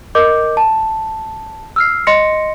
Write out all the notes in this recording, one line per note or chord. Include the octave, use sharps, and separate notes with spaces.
A#4 D#5 D6 G6
A5
E6 F6 C7
D#5 C6 A#6 C#7